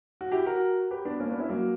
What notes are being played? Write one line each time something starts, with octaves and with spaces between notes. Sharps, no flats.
F#4
E4 G4
F#4 A#4
G4 B4
B3 D4
A#3 C#4
B3 D4
C#4 E4
F#3 A#3